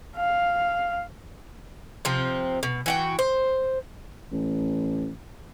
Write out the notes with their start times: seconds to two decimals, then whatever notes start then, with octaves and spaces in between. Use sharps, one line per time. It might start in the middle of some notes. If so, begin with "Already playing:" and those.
0.17 F5
2.05 C3 F3 C4
2.63 B2
2.86 E3 F#4 G5
3.19 C5
4.32 A1